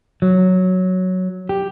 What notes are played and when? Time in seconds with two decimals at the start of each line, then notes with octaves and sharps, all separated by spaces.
0.22 F#3
1.49 G4